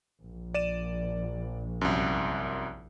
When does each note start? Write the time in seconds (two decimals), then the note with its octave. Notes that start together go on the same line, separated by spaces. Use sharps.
0.24 A#1
0.54 D5 D#7 E7
1.81 C2 F#2